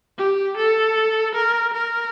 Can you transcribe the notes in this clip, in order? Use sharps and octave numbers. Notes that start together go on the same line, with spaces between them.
G4
A4
A#4
A#4